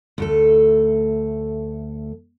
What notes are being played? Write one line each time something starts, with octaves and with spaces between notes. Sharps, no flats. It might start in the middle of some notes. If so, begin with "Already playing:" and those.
D2 A3 A4